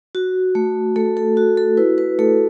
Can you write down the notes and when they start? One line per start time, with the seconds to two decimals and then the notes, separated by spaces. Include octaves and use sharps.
0.15 F#4
0.55 A3
0.96 A3 A4
1.17 A4
1.37 F#4
1.57 A4
1.77 E4 B4
1.98 B4
2.19 A3 A4